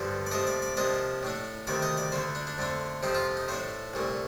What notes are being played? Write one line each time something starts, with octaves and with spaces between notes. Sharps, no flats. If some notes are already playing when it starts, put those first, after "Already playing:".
Already playing: G2 D3 F3
D5
C3 F3 A3 D#5
D5
D5
C3 F3 A#3 D4 D#5
A2 A3 D4
D2 C3 D#3 A3 D5
D#5
D5
D2 D3 A3 C5
D4
D4
F2 D3 A3 D4
F2 C3 F3 C4 D#4
F4
D#4
A2 A3 D4 C5
C2 A#2 A3